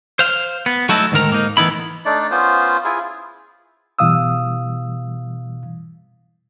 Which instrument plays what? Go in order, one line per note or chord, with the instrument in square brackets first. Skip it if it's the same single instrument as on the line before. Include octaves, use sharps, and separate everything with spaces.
[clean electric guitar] C5 F5
B3
F#3 A3 D#4 E4 F#4 A4
D2 G#2 D#3 A#4 A#5
G#2 A#3 D#4
A2 E3 B3 D#4 E4 B5
[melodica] A3 D4 D#4 D5
B3 C#4 F4 C5
E4 F4 G#4
[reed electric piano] B2 E3 G3 F5 D#6 E6